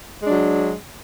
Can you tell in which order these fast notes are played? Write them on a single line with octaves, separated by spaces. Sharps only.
G#3 D4 F#3